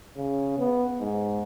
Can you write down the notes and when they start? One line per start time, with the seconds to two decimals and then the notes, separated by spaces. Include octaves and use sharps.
0.17 C#3
0.58 B3
1.00 G#2